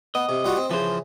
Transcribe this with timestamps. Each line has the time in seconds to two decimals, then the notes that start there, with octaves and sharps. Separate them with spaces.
0.15 B3 D#5
0.29 C3
0.44 G3 F4 F#4
0.57 C4
0.71 C#3 E3 F3 C5